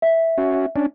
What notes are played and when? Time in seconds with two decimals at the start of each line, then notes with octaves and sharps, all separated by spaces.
0.02 E5
0.38 C#4 F#4
0.76 C#4 D4